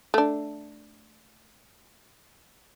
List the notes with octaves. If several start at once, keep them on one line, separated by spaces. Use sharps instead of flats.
A3 D4